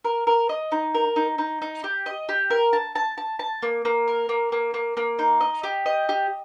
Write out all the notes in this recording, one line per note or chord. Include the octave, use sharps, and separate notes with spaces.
A#4
A#4
D#5
D#4
A#4
D#4
D#4
D#4
G4
D#5
G4
A#4
A5
A5
A5
A5
A#3
A#3
A#4
A#3
A#3
A#3
A#3
D#4
D#5
G4
D#5
G4